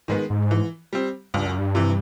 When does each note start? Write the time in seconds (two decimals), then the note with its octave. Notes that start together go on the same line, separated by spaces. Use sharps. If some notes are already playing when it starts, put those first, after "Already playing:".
0.08 G#2 D#3 G#3 B3
0.30 G#2
0.51 E3
0.93 G3 C4
1.34 C#2 G2
1.46 F#2
1.58 G2
1.75 C3 E3